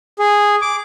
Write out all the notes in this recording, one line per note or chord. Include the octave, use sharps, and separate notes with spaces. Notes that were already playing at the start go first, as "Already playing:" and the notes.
G#4
D6